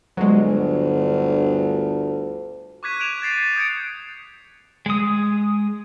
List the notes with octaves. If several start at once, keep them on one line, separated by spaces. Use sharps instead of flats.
G1 D2 F#3 G#3
C#6 D6 F#6 G#6 B6 D#7
F#6 D7 E7 F7
G#6 A6 C7
C#6
D#6 G6 G#6 C#7 D7
G#3 D#6